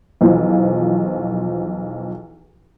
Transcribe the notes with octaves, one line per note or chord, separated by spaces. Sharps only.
B1 E2 F3